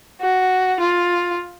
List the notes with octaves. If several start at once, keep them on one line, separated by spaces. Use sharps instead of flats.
F#4
F4